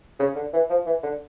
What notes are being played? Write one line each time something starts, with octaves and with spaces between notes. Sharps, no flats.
C#3
D3
E3
F3
E3
D3